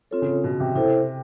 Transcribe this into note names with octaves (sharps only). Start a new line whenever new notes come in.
C4 F4 A4 C#5
C#3
B2
C3
C3 E4 A4 C5